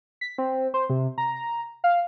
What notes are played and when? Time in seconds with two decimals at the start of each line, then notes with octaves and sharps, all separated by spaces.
0.21 B6
0.38 C4
0.74 C5
0.90 C3
1.18 A#5
1.84 F5